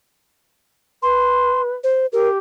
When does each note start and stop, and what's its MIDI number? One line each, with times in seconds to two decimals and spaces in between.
1.03 1.75 71
1.03 1.62 84
1.84 2.06 72
2.13 2.38 67
2.13 2.29 70